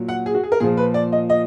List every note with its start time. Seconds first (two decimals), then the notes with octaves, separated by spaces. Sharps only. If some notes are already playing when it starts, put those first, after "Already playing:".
Already playing: A#2 F#3
0.08 F#5
0.26 G#4
0.35 F#4
0.43 G#4
0.52 A#4
0.60 A#2 F3 G#4
0.77 B4
0.94 D5
1.12 D#5
1.30 D#5